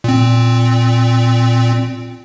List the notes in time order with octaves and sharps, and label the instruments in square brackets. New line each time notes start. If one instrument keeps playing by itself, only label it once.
[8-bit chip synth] A#2 C4